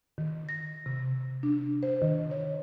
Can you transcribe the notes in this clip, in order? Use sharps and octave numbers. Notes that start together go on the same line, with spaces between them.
D#3
A#6
C3
D4
C5
D#3
C#5